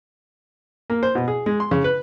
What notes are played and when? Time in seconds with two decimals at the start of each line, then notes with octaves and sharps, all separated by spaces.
0.90 A#3
1.03 C5
1.15 B2
1.28 G#4
1.46 G#3
1.60 C6
1.71 C#3
1.84 B4